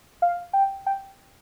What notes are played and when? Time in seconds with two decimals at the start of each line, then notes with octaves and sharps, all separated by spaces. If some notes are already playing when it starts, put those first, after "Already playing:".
0.22 F5
0.53 G5
0.86 G5